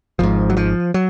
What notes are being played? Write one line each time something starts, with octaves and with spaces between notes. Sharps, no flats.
G#1 G#2 F3
F#3
F3
F#3